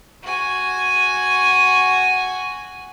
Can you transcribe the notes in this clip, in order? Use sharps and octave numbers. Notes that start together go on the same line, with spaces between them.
F#4 G#5